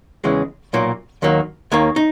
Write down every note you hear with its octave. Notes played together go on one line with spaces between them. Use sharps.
E2 C#3 E3 G#3
B1 A#2 F#3 A#3
D#2 D#3 F#3 A#3
D#2 D#3 A#3 C#5
D#4